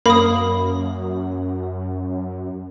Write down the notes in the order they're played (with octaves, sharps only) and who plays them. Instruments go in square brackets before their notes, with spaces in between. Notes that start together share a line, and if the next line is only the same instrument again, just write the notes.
[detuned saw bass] F#2 [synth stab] A#3 [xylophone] B5 D#6